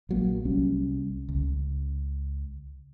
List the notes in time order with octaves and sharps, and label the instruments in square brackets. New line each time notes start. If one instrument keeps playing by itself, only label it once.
[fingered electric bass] A#1 F#3 A#3
C2 G3 C#4
C#2